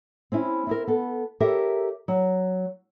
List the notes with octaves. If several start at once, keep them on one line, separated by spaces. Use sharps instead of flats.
C4 C#4 E4
C4 E4 A#4
B3 A4
G4 A4 A#4 C#5 E5
F#3